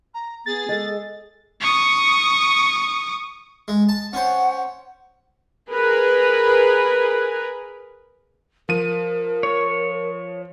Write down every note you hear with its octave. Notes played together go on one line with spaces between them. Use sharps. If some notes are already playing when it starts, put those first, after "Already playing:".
A#5
B3 G#4 A6
G#3 A4
C#6 D#6
G#3
A5
C#4 C5 F#5
G#4 A#4 B4
F3 A#4 D#7
C#5